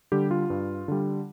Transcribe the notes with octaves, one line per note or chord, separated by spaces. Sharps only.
D3 G3 G4
F4
G2
D3 G3